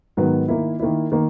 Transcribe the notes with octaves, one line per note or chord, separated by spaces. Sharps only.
G#2 D#3 F#3 B3
D#3 A#3 E4
D#3 A#3 E4
D#3 A#3